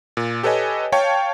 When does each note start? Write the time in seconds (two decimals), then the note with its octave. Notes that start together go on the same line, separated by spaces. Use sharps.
0.17 A#2
0.43 G4 A4 B4 C#5 D#5 G#5
0.92 C#5 F5 G5 A5 C#6